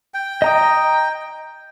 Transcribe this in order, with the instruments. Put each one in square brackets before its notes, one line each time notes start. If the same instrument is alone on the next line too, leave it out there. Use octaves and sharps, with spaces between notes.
[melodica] G5
[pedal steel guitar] D#5 A#5 D#6